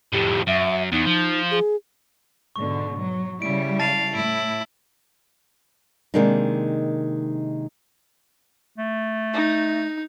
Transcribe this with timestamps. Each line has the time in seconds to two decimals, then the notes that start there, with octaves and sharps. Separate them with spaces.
0.13 F2 A2 G4
0.47 F#2 E5
0.92 E2 D#4
1.06 F3
1.51 G#4
2.56 G#2 B2 D3 C#6
3.00 F#3
3.42 C#3 G3 E4 D7
3.79 F5 A5 A6
4.15 A2 E4 D7
6.14 C3 D#3 G#3 A#3 D4 D#4
8.78 A3
9.33 D#4